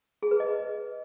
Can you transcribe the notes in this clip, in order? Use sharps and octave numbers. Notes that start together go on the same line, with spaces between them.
G#4
B4
D#5